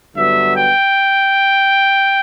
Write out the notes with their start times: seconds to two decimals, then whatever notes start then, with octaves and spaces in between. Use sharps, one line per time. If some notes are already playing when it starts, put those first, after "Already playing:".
0.14 G2 D3 F#3 B3 E5
0.55 G5